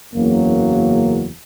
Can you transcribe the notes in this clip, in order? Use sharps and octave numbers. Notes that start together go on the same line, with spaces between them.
F#1 E2 C#3 F#3 A#3